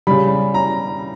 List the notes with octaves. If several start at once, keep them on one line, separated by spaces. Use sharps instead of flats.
C#3 G3 B5
A#5